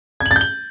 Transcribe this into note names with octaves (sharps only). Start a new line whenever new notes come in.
G#6
F#7
A6
G6
G7